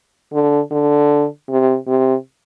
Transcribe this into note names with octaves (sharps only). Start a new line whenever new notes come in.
D3
D3
C3
C3